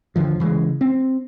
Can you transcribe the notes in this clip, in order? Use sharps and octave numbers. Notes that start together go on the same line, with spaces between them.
D#2 D3 F3
C#3 E3 F#3 G#3
C4